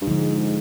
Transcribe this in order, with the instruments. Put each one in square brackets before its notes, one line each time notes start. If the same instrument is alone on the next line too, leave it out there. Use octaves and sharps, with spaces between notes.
[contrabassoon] G2
[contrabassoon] G#2 [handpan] D3 F3 G#3